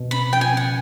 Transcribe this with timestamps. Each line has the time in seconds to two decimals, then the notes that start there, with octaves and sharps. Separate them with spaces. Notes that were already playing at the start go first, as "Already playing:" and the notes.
Already playing: B2
0.11 C#4 B5
0.31 F3 G5
0.41 G#5
0.52 C#3
0.57 F#5